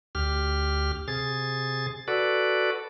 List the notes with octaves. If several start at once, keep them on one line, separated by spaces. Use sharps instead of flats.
D2 G4 F6
C3 G#4 A6
F#4 A4 B4 D5